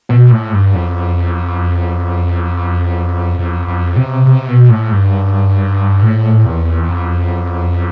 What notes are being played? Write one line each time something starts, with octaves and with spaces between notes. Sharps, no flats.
B2
A2
G2
F2
F2
F2
C3
C3
B2
A2
G2
A2
E2
F2